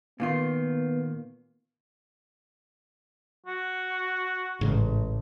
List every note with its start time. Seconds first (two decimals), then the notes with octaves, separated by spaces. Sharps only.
0.20 A#2 D#3 B3 F4
3.46 F#4
4.61 A1 G#2 C#3